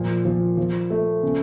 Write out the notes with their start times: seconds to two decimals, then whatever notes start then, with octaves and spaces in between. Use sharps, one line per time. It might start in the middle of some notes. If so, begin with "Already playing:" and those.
Already playing: A#2 F3
0.25 F3
0.57 F3
0.90 A3
1.23 C#3